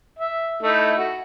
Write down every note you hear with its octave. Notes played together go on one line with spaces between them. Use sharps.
E5
A3 D#4 E4
F#4